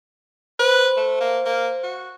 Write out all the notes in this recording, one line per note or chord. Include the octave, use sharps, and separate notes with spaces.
B4 C5
A3
A#3
A#3
F#4